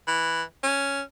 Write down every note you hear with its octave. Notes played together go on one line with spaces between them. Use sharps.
E3
C#4